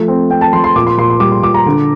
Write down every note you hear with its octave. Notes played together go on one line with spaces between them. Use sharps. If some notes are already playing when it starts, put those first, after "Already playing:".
Already playing: F3 A3
C4
C4 G5
A5
F3 C6
C6
A#2 D6
C6
A#2 C6
C6
G3 D6
C6
A#2 D6
A#5
D3